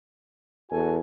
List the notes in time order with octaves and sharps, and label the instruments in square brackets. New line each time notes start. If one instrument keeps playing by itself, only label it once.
[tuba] E2 [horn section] F#4 A4 G#5